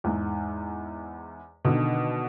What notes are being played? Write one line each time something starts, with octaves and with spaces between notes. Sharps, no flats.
E2 G#2
B2 D3 D#3